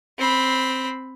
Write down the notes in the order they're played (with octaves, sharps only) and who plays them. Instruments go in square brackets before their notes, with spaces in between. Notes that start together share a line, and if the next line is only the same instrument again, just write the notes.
[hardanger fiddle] C4 B5